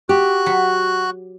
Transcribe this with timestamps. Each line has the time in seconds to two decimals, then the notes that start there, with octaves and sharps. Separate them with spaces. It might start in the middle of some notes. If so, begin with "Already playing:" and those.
0.09 F#4 G4 F#6
0.46 F#3 B5